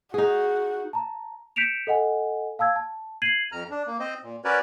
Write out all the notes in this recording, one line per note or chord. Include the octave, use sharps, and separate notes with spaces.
D#4 F#4 G#4
A5 A#5
G6 B6 C#7 D7 E7 F7
A4 D#5 F#5 G#5
F5 A5 E6 G#6
A5
G#6 C7 D#7 F#7
F2 A#5 F6
D4
A#3
C4 C5 D#5
A#2
C#4 F#4 A#4 B4 C#5 D5